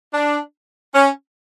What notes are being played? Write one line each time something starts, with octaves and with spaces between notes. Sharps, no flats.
D4
C#4